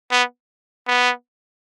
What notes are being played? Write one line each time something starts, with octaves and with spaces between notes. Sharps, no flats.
B3
B3